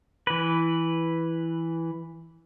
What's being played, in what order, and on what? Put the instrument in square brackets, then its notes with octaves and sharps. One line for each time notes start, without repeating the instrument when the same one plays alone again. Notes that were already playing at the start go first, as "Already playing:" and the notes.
[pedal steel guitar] E3 B4